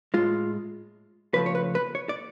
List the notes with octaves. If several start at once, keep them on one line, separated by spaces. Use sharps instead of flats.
A2 G#3 F4
C#3 F3 A3 B4
C#5
B4
B4
C#5
D5